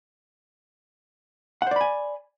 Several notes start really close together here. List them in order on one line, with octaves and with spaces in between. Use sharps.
F#5 C5 D5 B5 G#5